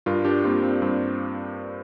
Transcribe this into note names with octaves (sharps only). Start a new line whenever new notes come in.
G2 F4 A#4
D4 G4
G3 A#3 C4 F4
C4
G2 C4